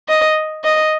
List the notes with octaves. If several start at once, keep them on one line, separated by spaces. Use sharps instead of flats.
D#5
D#5